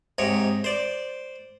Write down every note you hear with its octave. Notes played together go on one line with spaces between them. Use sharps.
G#2 C3 D#4 C#5
C5 D5